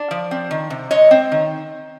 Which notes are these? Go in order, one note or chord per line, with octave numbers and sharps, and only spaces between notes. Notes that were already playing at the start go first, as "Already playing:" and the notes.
Already playing: D4
F3
C4
D#3
C3
G#3 C#5 D#5
C4
D#3